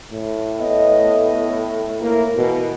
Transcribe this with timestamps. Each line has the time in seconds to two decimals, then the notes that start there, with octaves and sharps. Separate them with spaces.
0.13 A2
0.59 B3 D#5
2.00 A#3 E4 A#4
2.37 B2 E3